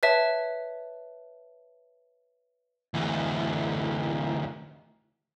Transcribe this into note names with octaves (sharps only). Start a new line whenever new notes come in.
B4 C#5 E5 A5
D2 E3